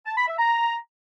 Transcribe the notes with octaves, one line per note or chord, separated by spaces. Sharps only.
A5
B5
E5
A#5